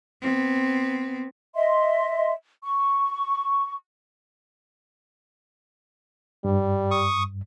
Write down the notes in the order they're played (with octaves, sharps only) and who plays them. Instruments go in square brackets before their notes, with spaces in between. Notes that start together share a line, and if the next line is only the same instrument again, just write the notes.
[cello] B3 C4
[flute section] D#5 E5 C6
C#6
[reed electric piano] G2 [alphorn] G3
[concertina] C#6 D#6